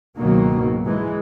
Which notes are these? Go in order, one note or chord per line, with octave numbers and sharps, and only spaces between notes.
C#2 G#2 B2 D#3 F#3 A#3
E3 G#3